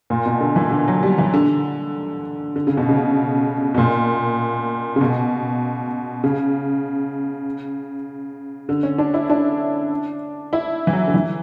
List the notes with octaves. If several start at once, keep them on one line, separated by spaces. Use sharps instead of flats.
A#2
B2
D3
E3
D3
F#3
G3
E3
D3
D3
C#3
B2
C#3
B2
A#2
C#3
B2
C#3
D3
C#4
D4
E4
D4
E4
E3
F#3
D3
E3